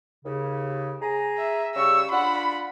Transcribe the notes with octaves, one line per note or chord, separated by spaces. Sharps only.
D#2 C#3
G#4 G#5 A#5
E5
C#3 G3 C#6 E6
D4 F4 F#5 B5